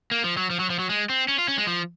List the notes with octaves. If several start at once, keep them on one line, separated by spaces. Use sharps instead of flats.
A#3
F3
F#3
F3
F#3
F3
F#3
G#3
C4
C#4
F4
C#4
G#3
F3